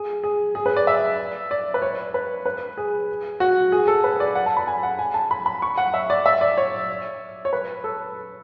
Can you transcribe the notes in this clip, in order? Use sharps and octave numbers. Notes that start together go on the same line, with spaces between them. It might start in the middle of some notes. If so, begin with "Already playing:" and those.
Already playing: G#4
G#4
G#4
B4
D5
E5
D5
B4
C#5
B4
B4
G#4
F#4
G#4
A4
B4
D5
F#5
A5
B5
G#5
F#5
G#5
A5
B5
B5
C#6
F#5
E5
D5
E5
D5
C#5
C#5
B4
A4